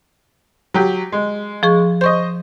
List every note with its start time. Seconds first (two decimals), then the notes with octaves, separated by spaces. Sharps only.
0.74 F#3 G4
1.12 G#3
1.63 F3 G#4 C#6
2.01 C5 D#5 C#6 G6